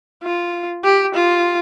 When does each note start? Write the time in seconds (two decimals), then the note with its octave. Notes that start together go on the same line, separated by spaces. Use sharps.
0.23 F4
0.84 G4
1.15 F4